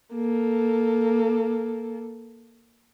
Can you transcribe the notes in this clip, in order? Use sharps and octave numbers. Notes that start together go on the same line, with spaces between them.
A#3 A4